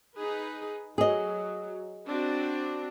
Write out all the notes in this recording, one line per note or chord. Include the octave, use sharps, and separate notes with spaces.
D#4 G#4 B4
F#3 G#4 D#5
C4 D4 F#4